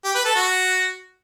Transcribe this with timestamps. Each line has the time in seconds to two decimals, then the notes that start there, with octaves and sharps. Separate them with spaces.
0.04 G4
0.15 B4
0.25 A4
0.35 F#4